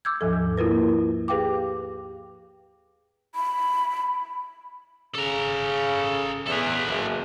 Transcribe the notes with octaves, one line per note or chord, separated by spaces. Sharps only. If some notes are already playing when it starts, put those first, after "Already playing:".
D6 E6 G6 G#6
D#2 G#2 F3 A4
A#3 E4 F4 A#4 B4
G4 G#4 B4 F5 G5 D6
B5
C#3 A4 A#5
E2 A4 B4
F#1